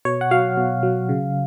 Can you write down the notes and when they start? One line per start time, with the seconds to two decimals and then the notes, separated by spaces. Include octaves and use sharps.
0.05 B2 C#5
0.21 F#5
0.31 F#3 F5
0.57 B2
0.83 F#3
1.09 C#3